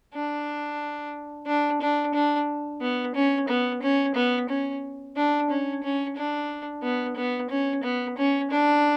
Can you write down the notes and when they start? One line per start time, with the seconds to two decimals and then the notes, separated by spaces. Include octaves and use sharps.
0.14 D4
1.47 D4
1.81 D4
2.14 D4
2.81 B3
3.15 C#4
3.48 B3
3.82 C#4
4.15 B3
4.49 C#4
5.16 D4
5.50 C#4
5.83 C#4
6.16 D4
6.83 B3
7.16 B3
7.50 C#4
7.83 B3
8.18 C#4
8.51 D4